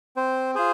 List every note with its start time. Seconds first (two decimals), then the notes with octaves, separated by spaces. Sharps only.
0.16 C4 C5
0.55 F4 G#4 C5